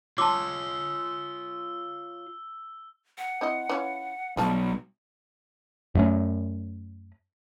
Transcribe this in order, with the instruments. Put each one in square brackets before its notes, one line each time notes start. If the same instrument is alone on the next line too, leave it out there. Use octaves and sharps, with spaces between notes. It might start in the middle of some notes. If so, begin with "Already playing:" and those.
[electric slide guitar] F4 C#5 [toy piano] A5 C6 D6 [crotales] E6
[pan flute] F#5
[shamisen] C4 E4 D#5
E3 C#4 F4
[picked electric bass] B1 [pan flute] G3 [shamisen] A3 F4 A5
[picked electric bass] F#2 A3 C#4